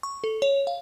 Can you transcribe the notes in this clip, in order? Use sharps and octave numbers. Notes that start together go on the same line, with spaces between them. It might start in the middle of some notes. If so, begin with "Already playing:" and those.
C#6
A4
C#5
F5